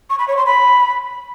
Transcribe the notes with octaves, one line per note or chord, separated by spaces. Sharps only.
C#6
B5
C#5
C6
B5